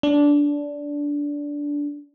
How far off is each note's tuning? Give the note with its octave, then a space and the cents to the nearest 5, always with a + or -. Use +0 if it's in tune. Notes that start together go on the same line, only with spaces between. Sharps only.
D4 -15